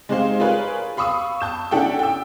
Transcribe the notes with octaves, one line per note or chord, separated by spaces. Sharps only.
G#3 C4 D#4 G4 C5 F5
F4 G#4 A#4 B4 C#5
F5 B5 C#6 D#6 E6
A5 G6 E7
C#4 D4 E4 A4 F#5 G5
G5 E6